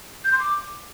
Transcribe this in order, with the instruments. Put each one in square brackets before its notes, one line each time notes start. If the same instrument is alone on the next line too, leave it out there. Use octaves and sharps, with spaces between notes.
[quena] G6
C6
D6